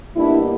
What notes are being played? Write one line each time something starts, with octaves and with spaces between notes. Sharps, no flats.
B2 G3 A#3 D4 E4